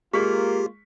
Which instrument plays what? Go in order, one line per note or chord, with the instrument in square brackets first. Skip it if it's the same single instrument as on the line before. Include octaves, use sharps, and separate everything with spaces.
[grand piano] G#3 C#6 B6 [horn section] A#3 F4 [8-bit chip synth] G4